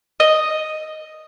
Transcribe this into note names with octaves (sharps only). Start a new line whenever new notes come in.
D#5